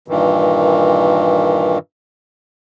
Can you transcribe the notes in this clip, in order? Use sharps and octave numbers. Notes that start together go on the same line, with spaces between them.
G2 A#2 D#3 E3